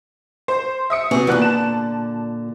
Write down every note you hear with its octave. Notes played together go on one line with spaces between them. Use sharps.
C5
E5 D#6 C#7
C3 B3 F#4 G#4
A#2 D3 E3 B3 F#6
A5 E7